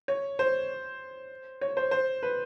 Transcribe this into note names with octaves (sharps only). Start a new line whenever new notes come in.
C#5
C5
C#5
C5
C5
B4